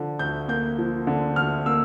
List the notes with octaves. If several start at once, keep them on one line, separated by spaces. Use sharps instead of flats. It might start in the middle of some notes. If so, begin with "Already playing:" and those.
Already playing: D3 F3
D2 G6
A#3 G6
F3
D3
D2 F6
A#3 E6